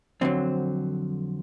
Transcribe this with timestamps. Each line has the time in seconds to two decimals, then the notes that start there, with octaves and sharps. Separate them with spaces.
0.21 F2 D3 F#3 C4